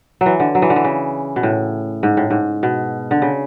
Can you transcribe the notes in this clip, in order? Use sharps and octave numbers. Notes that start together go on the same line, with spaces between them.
F#3
E3
D3
F#3
E3
D3
E3
C#3
B2
A2
G#2
A2
G#2
B2
D3
C#3